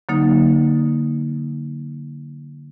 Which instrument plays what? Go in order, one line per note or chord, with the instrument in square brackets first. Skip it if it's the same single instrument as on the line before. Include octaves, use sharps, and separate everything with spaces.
[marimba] D3 F#3 A#3 D#4